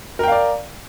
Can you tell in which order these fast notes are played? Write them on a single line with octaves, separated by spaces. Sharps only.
A#4 G5 F5 D5